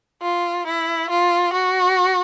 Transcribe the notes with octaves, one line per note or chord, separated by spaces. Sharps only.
F4
E4
F4
F#4